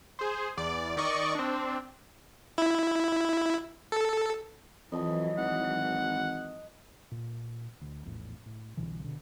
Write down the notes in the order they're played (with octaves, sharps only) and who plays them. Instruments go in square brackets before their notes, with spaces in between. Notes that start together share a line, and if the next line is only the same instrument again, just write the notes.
[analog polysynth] G#4 C5
E2 D5
D#3 D5 D#5 C#6
C4 D4
[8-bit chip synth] E4
A4
[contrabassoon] F2 [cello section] E3 F#3 [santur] D#5 A5 D#6
[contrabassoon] G#1 [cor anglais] F#5
[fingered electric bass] A#2
D2
A#1 E2 A2
A2
C2 B2 D3 E3
B2 D3